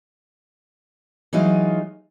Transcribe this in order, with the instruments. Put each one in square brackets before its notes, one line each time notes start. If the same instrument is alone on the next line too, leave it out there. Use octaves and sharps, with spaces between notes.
[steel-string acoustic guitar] E3 F#3 G#3 D#4 F4